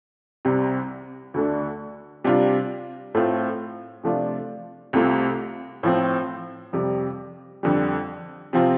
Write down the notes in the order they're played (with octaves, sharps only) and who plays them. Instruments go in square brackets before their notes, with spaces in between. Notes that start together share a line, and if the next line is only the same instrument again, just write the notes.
[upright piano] C2 C3 G3
D2 D3 A3 D4
C3 G3 D4 F4
A2 A3 C4 F4
C3 F3 A3 D4 F4
C2 C3 A3 F4
A2 F3 C4
F2 C3 G3
F2 D3 G3
C3 F3 C4 F4